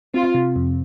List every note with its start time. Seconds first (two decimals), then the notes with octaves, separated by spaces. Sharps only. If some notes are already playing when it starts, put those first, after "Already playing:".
0.14 C4 F4
0.35 C3
0.56 F2